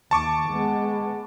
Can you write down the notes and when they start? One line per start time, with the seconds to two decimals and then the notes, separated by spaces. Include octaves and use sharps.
0.11 D#2 A5 C#6 D6
0.49 G#3 B3